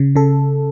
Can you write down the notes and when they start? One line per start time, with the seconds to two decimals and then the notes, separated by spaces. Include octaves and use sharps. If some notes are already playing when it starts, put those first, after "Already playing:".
Already playing: C#3
0.16 C#3 A4